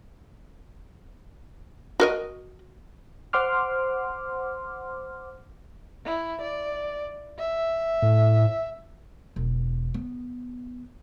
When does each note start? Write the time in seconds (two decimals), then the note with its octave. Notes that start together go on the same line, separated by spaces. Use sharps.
2.00 F#4 A#4 D#5
3.33 C5 F#5 C6 D6 F6
6.05 E4
6.41 D5
7.39 E5
8.02 A2
9.36 E1
9.94 B3